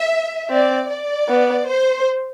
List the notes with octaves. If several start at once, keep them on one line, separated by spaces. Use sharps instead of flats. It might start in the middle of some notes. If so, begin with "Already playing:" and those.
Already playing: E5
C4 D5
D5
B3
C5